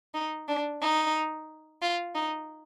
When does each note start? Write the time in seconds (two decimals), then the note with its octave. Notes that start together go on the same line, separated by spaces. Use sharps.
0.14 D#4
0.48 D4
0.82 D#4
1.82 F4
2.15 D#4